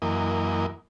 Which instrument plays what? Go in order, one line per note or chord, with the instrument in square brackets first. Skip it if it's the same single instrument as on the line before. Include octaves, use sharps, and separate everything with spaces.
[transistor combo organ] F#2 E3 A#3 D#5